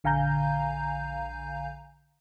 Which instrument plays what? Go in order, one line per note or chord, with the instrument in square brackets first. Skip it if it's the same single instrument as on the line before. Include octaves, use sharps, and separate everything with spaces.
[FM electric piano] A#1 D3 F5 G#5 A#5 G6